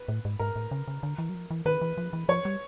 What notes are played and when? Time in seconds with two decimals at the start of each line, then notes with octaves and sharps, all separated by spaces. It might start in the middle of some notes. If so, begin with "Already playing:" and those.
Already playing: B4
0.08 A2
0.25 G#2
0.39 G#2 A#4
0.56 A2
0.71 C#3
0.88 C#3
1.03 D3
1.18 E3
1.29 F#3
1.35 F3
1.51 E3
1.66 D#3 B4
1.81 E3
1.98 F3
2.13 E3
2.29 F3 C#5
2.45 G3